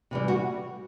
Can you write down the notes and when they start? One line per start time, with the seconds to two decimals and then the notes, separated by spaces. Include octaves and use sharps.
0.11 C3 E3 G3
0.28 F#4